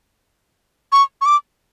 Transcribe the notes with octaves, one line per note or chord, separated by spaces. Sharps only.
C#6
C#6
D6